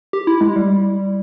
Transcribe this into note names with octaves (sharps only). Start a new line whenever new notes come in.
G4
E4
G#3
G3